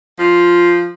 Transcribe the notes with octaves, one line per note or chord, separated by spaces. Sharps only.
F3 F4